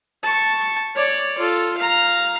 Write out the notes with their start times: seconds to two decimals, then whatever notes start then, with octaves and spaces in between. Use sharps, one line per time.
0.23 A5 C#6
0.95 C#5 D5
1.38 F4 A4
1.77 F5 A#5